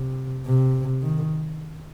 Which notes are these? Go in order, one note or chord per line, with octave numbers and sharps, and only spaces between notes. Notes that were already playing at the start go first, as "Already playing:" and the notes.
Already playing: C3
C3
D#3